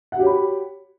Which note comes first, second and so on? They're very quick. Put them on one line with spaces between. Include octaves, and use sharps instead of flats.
F#5 F#4 G4 C#5 B5